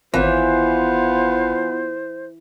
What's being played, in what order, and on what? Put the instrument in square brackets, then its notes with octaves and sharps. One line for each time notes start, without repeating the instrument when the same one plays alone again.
[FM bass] G#1 [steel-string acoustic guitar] E3 [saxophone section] B3 F4 [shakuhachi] C5